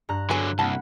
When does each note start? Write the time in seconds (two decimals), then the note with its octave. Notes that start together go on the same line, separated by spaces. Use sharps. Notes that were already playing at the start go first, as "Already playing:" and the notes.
0.09 G2 A#5 F#6
0.30 D3 F#3 B3 F#4 G#4
0.59 C2 A#3 F#5 A5 B5